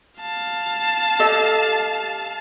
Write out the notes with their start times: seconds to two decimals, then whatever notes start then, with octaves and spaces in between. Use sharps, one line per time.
0.21 F5 A5
1.19 G4 A4 D#5